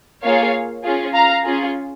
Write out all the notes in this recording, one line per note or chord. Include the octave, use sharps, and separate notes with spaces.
A#3 F4 G#4 C#5 F5
C#4 F4 G#4
F5 A#5
C#4 F4 G#4